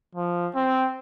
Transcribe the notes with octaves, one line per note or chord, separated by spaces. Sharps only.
F3
C4